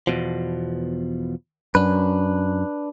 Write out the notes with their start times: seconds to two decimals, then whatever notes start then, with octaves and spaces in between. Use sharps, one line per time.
0.07 E2 B2 F3
1.75 F#2 D4 B4